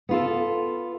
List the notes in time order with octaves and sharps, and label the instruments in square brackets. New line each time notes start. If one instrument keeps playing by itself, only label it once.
[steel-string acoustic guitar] B3 F4 A4